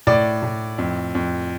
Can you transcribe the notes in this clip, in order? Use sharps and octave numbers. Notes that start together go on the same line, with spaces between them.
A2 D5
A2
F2
F2